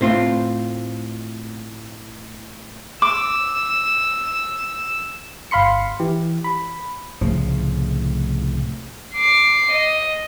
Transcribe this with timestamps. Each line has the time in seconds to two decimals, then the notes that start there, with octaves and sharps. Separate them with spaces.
0.01 A2 C4 F4
3.02 D6 E6
5.51 G1 F5 B5 C6 C#7
6.00 E3 G4
6.44 B5
7.21 C2 A2 C#3 F3
9.14 D6 C7
9.71 D#5